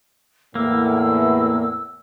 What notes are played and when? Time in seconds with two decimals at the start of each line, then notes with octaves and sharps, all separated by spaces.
0.55 E2 A2 A#3 E6